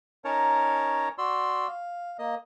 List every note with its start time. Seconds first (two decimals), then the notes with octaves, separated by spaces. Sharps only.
0.25 C#4 D#4 A#4 C#5 A5 A#5
1.18 F#4 D5 C6 E6
1.68 F5
2.19 A#3 D#5